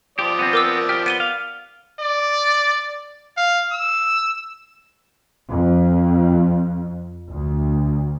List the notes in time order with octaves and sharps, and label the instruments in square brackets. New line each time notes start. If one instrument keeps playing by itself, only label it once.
[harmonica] F3 D5 D#6 [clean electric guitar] G4
[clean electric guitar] B3 C4
[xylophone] A#4 D6 E6
[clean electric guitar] G4 [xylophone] F6
[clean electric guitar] B3 [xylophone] D7 D#7 G7
[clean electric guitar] F5
[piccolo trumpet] D5
F5
E6
[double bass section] F2
D2